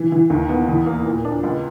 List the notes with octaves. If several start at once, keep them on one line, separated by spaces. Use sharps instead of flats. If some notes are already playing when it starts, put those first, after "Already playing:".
Already playing: E3
E3
D#2
B3
E2
A#3
A#2
D4
C#2